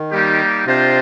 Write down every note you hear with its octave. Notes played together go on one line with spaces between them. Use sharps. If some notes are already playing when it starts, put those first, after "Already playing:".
Already playing: D#3
G3 A#3 D#4 G4
C3 D4 F4 C5 D#5 G5